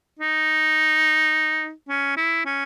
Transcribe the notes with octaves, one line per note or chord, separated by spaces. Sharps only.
D#4
C#4
E4
C#4